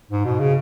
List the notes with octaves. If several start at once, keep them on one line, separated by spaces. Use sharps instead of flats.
G#2
B2
C#3